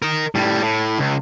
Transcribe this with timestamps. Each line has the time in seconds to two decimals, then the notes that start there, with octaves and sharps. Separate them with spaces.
0.02 A#4 D#5
0.35 A2 G3
0.62 A2
0.99 C#2